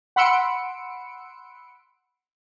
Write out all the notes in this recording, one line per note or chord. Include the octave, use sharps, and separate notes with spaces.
F#5 B5 C6 E6 C#7 D7